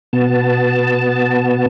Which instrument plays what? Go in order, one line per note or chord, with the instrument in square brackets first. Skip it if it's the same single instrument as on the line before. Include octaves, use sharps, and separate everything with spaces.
[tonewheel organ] B2 B3 A5